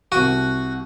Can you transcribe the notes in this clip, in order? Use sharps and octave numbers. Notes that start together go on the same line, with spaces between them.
C2 F#4 D#7